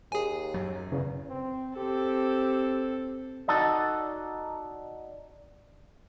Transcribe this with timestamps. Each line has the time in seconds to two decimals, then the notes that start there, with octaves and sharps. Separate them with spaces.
0.12 D#2 G#4 G#5
0.54 F#2 F#3
0.92 E2 C#3
1.29 C4
1.76 C4 G4 A4
3.48 D#4 F#4 A4 D5 D#5